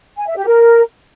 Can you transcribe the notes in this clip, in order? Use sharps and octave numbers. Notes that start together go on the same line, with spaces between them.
G#5
E5
G4
A#4